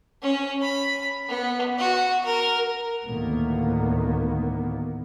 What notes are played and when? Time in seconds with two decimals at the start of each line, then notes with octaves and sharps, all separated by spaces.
0.22 C#4
0.62 B5
1.29 B3
1.78 F#4
2.26 A#4
3.05 D2 A2 D#3 A#3 B3